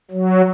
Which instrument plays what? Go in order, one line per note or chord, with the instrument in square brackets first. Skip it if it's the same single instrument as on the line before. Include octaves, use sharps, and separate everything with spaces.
[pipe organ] F#3